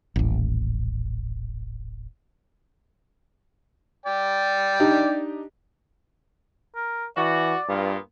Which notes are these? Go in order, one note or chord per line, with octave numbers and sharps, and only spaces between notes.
D#1 A1
D5 G5
D4 D#4 G4
A#4
E3 F#4 D5
G2 A#2 B3 F4